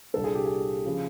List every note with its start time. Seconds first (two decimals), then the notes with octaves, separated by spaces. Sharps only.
0.14 C2 A#2 G3 A#3 D4 A4
0.24 G#4
0.35 G4
0.46 G#4
0.86 C#3 F3